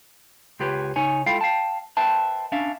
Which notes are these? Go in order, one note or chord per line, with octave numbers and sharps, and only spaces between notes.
C#2 F4 G4 B4 C#5
C#3 D#4 C#5 G#5
G#3 E4 F4 A4 F5 G5
F5 G5 A5
B4 C5 E5 G5 A5
C#4 D4 E5 F5